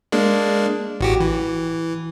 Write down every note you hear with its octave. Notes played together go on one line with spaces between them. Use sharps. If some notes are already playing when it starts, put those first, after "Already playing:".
G#3 A#3 D4
A1 F#4 G4
E3